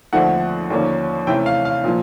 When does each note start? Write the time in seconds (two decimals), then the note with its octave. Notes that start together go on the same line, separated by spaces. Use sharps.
0.13 D#2 D3 F3 A3 C4 F#5
0.70 D#2 D3 F3 A#3 C#4
1.27 C3 E3 A3 C#4 G5
1.46 F5
1.65 F5
1.84 A#2 F3